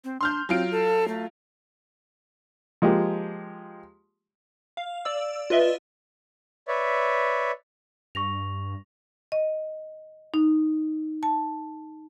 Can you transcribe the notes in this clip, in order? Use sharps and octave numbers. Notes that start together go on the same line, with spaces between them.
C4
D4 C6 F6 G6
F#3 C4 F4 D7
A4
A3
F3 G#3 A#3 G4
F5
D5 E6
F4 B4 D#5 E5
B4 C#5 D5 E5
G2 C#6 A#6 F7
D#5
D#4
A5